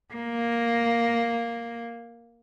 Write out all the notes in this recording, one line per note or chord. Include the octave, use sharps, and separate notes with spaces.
A#3